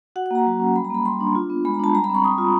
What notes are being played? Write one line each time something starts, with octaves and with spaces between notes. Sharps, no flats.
F#4 F#5
F#5
A#3 A#5
F#3
C#4
G3 B5
A#5
A#3 B5
G3 C6
D4
F4
B3
G#3 B5
A#5
D4 A5
G3 A#5
B5
C4 C#6
G3 D#6
F4